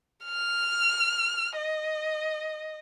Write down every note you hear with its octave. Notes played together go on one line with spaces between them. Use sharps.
F6
D#5